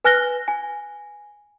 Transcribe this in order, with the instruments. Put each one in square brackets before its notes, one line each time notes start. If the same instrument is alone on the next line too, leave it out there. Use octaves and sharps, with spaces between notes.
[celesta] B4 G#5 F6 F#6 A#6 G7
G#5